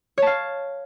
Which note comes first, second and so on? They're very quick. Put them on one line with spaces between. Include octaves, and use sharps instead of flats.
C#5 A5 F5